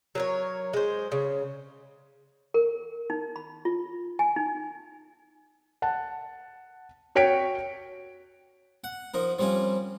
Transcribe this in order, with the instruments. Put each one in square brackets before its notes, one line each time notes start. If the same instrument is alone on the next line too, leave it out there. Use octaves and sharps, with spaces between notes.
[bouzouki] F#3 A#4 C#5
G#3 C5
C#3
[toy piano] A#4
D#4
B5
F4
G#5
D#4
[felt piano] F#5 A5
F#4 C#5 G5 B6 D7
[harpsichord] F#5
F3 D#4 A#4
F3 G3 C4 C#4 F4